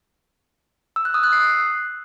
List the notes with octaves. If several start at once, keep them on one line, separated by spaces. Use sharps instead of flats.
E6
F#6
D#6
F#6
C7